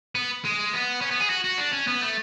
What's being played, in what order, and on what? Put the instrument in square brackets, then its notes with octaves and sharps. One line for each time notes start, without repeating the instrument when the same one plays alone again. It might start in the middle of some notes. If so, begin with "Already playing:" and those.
[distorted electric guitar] B3
G#3
B3
C#4
B3
G#4
F#4
F#4
D4
C#4
B3
A3